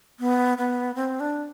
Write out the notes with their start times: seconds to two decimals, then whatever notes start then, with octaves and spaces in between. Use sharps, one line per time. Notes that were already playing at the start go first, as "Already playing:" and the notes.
0.20 B3
0.58 B3
0.95 C4
1.20 D4